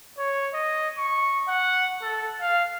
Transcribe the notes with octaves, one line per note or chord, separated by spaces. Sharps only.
C#5
D#5
C#6
F#5
A4
F5